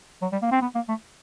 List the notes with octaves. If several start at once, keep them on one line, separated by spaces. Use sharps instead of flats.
F#3
G3
A#3
C4
B3
A#3
A3